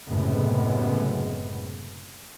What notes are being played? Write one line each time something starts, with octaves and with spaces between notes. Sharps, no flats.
F#1 F#2 A2 C3 G#3 B3